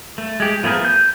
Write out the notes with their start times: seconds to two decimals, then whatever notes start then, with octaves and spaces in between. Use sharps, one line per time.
0.18 A3
0.40 G#3 G4
0.63 F3 A3 B3 G#4 A#4
0.85 G6